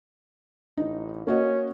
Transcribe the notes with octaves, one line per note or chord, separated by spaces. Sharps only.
A1 D#4
A#3 C#4 F#4 D#5